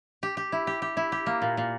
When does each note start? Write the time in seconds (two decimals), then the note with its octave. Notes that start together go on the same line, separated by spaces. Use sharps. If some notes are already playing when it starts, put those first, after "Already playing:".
0.23 G4
0.37 G4
0.52 E4
0.67 G4
0.82 G4
0.97 E4
1.12 G4
1.26 A#3
1.42 A#2
1.57 A#2